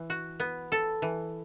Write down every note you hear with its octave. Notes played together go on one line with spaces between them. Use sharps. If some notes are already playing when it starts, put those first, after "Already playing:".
Already playing: E3
F#4
B3
A4
E3